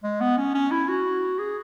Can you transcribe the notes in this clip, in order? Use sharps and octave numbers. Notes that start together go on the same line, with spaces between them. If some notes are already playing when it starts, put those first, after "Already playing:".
G#3
B3
C#4
C#4
E4
F#4
G#4